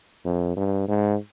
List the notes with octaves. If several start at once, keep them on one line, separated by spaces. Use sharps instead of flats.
F2
G2
G#2